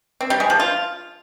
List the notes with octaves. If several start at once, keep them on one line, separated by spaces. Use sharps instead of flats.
C4
G3
G#3
F3
F4